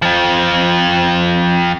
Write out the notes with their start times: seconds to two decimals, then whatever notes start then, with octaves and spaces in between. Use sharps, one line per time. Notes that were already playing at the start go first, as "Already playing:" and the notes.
0.02 F2 F3